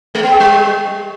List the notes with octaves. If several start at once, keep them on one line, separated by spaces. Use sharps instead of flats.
G#3
B3
G#4
G3